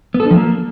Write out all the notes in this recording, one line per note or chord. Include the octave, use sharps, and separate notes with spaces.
B3
A4
D4
F3
A#3